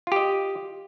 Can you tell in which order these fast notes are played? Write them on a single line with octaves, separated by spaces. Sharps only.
F4 G4 D#5